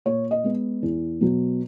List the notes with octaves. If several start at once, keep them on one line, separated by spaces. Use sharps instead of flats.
A#2 C#5
D#5
G#3 B3
E2
B2 F#3